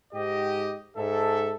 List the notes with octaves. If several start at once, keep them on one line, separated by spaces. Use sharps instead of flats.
G#2 G4 D#5
G#2 A4 E5